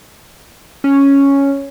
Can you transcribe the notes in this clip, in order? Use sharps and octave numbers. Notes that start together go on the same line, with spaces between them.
C#4